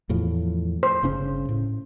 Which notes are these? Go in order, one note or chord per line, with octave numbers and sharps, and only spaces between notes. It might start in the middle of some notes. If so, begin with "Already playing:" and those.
E2 A2 F3
C5
G1 C#3 C#4
A2